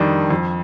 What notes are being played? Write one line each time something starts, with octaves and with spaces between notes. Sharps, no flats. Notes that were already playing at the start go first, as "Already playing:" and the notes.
Already playing: F2 D#3 G3 D4
F2